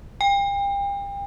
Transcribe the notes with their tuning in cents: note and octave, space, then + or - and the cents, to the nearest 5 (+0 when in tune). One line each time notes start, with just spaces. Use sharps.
G5 +35